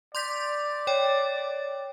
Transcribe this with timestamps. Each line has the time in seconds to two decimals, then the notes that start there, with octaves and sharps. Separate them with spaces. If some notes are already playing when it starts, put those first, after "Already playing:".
0.15 D5 C6 G6 B6
0.87 C#5 G5